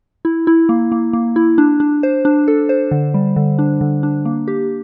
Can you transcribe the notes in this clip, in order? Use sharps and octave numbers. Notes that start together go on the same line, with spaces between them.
E4
E4
A#3
A#3
A#3
E4
D4
D4
C5
D4
A4
C5
D3
G3
D3
D4
D3
D4
A#3
G4